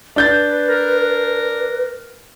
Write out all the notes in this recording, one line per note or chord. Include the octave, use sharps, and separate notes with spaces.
D4 B4 G6 A6
A#4